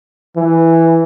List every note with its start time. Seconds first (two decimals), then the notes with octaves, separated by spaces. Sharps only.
0.37 E3